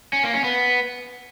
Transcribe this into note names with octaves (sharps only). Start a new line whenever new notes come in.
C#4
A#3
C#4
B3